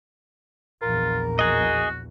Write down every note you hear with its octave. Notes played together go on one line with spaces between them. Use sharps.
A#1 E2 F4 A#4
F#4 G#4 D#5